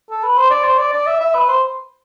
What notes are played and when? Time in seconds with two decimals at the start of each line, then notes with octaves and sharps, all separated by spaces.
0.10 A4
0.23 B4
0.37 C5
0.50 D5
0.64 C5
0.78 D5
0.93 D5
1.06 E5
1.20 E5
1.35 B4
1.48 C5